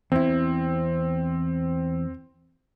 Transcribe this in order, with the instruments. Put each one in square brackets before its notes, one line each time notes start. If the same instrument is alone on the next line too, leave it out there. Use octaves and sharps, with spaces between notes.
[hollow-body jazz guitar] E2 E4 [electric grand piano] C4